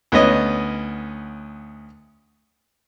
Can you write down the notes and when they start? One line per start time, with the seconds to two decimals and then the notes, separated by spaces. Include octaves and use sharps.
0.12 D2 B3 C#4 D#5